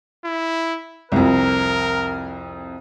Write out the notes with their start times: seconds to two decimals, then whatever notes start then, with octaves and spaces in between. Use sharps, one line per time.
0.25 E4
1.12 C2 F2 A#4